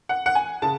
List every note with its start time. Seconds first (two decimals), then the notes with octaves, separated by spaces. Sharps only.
0.09 F#5
0.26 F#5
0.35 G#5
0.62 C#3 A5